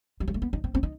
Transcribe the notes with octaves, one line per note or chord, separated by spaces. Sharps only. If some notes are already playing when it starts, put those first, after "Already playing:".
F#3
G3
A3
B3
D#4
C4
C4
D#4